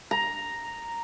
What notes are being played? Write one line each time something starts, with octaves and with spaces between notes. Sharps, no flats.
A#5